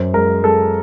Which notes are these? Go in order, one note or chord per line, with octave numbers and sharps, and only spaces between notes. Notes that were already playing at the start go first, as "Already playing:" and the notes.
Already playing: F#2 C5
G#3 A#4
G#3 A4